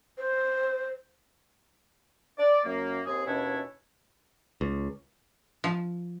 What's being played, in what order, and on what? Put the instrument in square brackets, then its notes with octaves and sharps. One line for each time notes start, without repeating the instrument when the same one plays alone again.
[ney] C5
[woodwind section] D5
F#2 A#3
D#2 C4 G#4
D#2 B2 C#4 D4 E4 C#5
[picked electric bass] C#2
[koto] F3